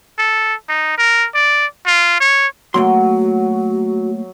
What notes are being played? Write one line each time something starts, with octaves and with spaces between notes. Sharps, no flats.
A4
D#4
A#4
D5
F4
C#5
F#3 A3 A#3 F#4 C6